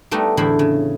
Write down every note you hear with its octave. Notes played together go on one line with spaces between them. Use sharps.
G3 A3 B3 D#4
E2 A2 D3 E4 C5 B5
C#3